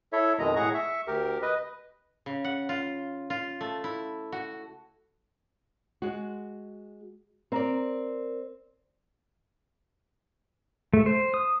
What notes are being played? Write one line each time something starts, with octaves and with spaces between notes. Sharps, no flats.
E4 A4 C#5 E5
F2 B2 D#3 G#3 D#5 A#5
A2 G#4 F#5 A#5 C#6
E5 C#6
D2 G4 A#4
B4 D#5
C#3
F#5
F4
F4
A3
E4
F#4
G#3 F#4
C4 A#4 D5
A3
C5
D#6